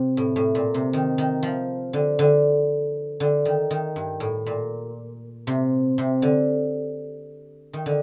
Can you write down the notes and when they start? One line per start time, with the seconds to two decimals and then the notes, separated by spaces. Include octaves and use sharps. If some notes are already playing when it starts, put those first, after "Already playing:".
Already playing: C3
0.17 A2
0.36 A2
0.55 A#2
0.74 C3
0.93 D#3
1.18 D#3
1.43 F3
1.93 D3
2.19 D3
3.20 D3
3.45 D#3
3.71 D#3
3.96 G2
4.20 A2
4.46 A#2
5.47 C3
5.98 C3
6.22 D3
7.73 D#3
7.86 D3